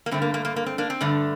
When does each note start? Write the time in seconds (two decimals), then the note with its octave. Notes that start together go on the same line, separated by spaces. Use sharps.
0.06 A#3
0.11 G2 D3 A3 C4
0.22 A#3
0.34 A#3
0.45 A#3
0.56 A#3
0.66 C4
0.78 A#3 D4
0.90 C4
1.01 G2 D3 A3